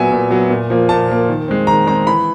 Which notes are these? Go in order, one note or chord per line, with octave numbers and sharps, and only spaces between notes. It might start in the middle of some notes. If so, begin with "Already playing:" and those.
Already playing: A#2 F#3 B3 E5 G#5
A#2
F#3 B3
A#2
F3 A#3
A#2 A5
F3 A#3
D#3
G#3 C4
D#3 A#5
G#3 C4 A#5
E3 B5